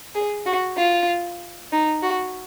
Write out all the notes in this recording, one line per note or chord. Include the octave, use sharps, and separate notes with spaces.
G#4
F#4
F4
D#4
F#4